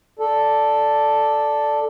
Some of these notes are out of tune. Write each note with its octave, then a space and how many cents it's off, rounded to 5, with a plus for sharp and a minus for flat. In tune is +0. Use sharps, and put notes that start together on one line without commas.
A4 +0 D5 +0